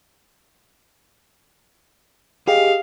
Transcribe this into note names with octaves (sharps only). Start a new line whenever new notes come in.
G4 G#4 D#5 F5